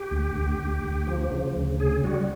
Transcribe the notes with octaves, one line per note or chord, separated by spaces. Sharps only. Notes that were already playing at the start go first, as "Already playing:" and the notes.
Already playing: G4
D2
D2
D2
D2
F3
C#3
D2
C#3 G#4
G3 F#4